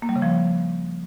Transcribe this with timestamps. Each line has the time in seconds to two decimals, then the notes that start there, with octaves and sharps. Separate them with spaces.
0.02 A#3
0.09 G3
0.16 C#3
0.22 F3